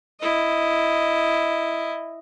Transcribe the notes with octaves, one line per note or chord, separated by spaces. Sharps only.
E4 D#5